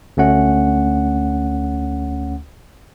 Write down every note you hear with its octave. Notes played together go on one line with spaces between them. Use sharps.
D2 A3 C#4 F#5